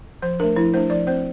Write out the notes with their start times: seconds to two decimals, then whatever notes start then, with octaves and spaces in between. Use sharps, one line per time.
0.22 F3 C5
0.40 A3 D4 A#4
0.56 F3 E4
0.73 A3 D4 C5
0.90 F3 D5
1.07 C4 C5